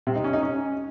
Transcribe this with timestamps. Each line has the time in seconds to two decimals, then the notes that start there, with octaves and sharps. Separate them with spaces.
0.07 C3
0.16 D#4
0.24 C#4
0.33 D#4
0.42 C#4